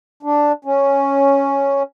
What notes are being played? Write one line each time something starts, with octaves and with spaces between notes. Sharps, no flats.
D4
C#4